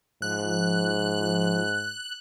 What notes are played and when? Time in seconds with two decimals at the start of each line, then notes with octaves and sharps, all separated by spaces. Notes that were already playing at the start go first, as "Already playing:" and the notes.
0.22 G#2 F3 F#6